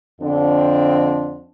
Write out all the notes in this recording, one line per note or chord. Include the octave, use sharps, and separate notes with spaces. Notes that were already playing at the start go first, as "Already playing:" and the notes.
F2 D3 C4 D4